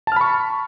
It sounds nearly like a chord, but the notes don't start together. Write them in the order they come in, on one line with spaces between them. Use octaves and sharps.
A5 F6 B5 C#6